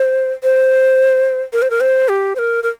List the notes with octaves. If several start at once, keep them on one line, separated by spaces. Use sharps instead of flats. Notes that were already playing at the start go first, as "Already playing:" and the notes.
Already playing: C5
C5
A#4
C5
A#4
C5
G4
C5
A#4
A#4